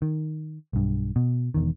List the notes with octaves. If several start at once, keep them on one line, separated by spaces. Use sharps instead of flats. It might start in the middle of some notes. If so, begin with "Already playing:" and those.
D#3
B1 G2
B2
E1 E2 D#3